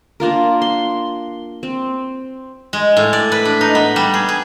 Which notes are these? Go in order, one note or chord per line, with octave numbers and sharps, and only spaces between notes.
A#3 D4 F4 A#4
C6
C4
G#3
A2
D5
B4
D4
D#4
B3
G3
G#4
G#4